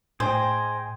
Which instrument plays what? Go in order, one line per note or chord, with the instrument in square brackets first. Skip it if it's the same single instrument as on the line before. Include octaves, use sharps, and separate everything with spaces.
[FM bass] A2 [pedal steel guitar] G#4 D#5 G5 [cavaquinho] C5